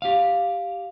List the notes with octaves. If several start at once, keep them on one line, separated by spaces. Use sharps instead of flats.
G4 F5